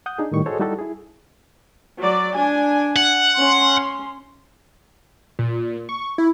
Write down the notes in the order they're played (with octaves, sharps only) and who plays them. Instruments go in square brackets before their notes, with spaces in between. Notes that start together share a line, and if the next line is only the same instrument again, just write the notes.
[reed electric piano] F#5 D#6 G6
D4 D#4 G#4
A2 D#3 G3 C#6
F#4 G#4 A4 C5 C#5 D#5
G3 D#4 E4 F#4 G4 A4
E4 G#4
[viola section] F#3 D5
D4 G#5
[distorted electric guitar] F#5
[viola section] C#4 C6
[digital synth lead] A#2
C#6
E4